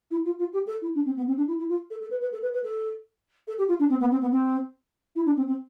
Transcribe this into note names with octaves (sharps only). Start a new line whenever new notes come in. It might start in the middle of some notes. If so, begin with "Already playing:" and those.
E4
F4
F4
G4
A4
E4
D4
C4
B3
C4
D4
E4
E4
F4
A4
A4
B4
B4
A4
B4
B4
A4
A4
G4
F4
D4
C4
B3
C4
B3
C4
E4
D4
C4
C4